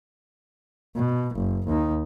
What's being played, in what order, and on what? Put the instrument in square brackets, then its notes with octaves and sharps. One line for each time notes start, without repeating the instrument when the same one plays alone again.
[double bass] B2
F#1
D#2 D#4